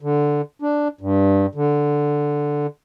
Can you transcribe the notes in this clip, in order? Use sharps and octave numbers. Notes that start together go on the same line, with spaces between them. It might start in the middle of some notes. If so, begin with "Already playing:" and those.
D3
D4
G2
D3